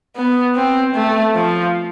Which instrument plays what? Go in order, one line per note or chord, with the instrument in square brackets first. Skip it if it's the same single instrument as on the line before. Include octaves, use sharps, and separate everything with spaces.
[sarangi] B3
C4
A3
F3